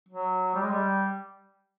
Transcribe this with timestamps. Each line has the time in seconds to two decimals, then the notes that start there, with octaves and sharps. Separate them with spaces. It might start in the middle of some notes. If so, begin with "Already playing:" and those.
0.09 F#3
0.55 G3
0.63 G#3
0.71 G3